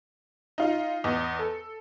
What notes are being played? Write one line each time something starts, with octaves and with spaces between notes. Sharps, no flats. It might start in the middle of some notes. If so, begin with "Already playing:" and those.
D#4 F4
E2 D#5
A4